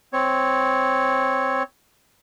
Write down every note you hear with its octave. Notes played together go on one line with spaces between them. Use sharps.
C4 C#5